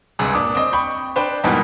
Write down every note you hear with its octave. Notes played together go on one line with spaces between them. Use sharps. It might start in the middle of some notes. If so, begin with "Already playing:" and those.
C#2 G2 C3 G#4
A#2 D4 D6 D#6
C4 D#5
G5 B5 C#6 G6
D4 B4 C5 G5
E2 G#2 B2 D#3 E3 G3